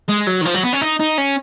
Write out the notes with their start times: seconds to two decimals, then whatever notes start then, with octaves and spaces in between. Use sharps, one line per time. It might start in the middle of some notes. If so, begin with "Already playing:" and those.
0.09 G#3
0.27 F#3
0.42 D#3
0.45 F3
0.54 F#3
0.63 B3
0.73 C#4
0.81 D#4
1.00 D#4
1.18 C#4